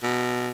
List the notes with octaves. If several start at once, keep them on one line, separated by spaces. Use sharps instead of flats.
B2